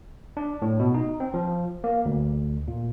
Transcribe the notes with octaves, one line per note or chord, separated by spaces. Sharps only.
D4
A2
B2
D#4
C4
F3
A#3
D2
A#2